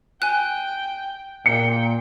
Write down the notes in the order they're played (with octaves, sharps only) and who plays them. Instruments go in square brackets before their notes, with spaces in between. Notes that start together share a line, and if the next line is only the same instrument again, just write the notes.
[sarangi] G5 [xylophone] G#5 F#6
[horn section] A#2 [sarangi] G5 [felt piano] C#7